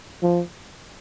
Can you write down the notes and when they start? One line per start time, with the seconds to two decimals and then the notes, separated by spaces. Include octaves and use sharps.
0.22 F3